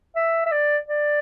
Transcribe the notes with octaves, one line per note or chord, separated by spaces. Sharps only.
E5
E5
D5
D5